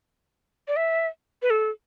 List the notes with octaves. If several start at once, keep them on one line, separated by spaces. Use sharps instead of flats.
D5
E5
B4
A4